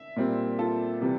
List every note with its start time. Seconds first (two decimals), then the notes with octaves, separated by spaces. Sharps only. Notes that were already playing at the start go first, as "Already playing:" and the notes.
Already playing: E5
0.16 A#2 G3 C4
0.58 F4 A4
1.01 C3 E3 G3